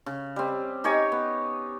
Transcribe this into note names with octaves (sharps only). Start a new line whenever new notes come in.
C#3
G3 C4
D#4 G4 C#5 G#5
B3